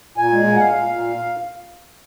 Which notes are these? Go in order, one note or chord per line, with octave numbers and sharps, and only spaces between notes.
A#2 G#5
G#3
A#2
F#5
A#2 F5
A#2
A#2